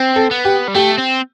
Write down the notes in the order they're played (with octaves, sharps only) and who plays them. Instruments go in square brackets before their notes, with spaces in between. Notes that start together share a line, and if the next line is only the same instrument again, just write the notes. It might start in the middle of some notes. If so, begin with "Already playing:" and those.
Already playing: [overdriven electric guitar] C4
[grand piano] A4
[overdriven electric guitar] B3
[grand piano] G4
[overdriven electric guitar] G3
[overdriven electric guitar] A3 [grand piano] G4
[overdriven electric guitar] C4